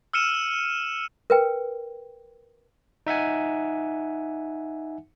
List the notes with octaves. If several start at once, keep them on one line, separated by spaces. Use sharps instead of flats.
E6 F6 C#7 D#7 E7
A#4 B4 G5
D#4 E5 F#5 G#5